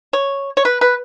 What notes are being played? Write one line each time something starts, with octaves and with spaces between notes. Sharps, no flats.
C#5
C#5
B4
B4